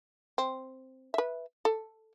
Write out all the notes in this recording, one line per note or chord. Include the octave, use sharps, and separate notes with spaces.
C4
B4 E5
A4